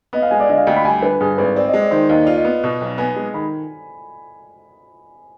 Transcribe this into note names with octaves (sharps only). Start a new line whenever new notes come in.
B3 D#5
F5
G#3 G#5
D5
D3 D#5
F5
D2 G5
B5
G3 G#5
D3 B4
G2 G#4
G#1 B4
C4 D5
D#5
G#3
D5
D#3 C5
D#2 D#5
F4 D5
D#5
B3
B2
B1
B3 G#5
G#3
D#3 B5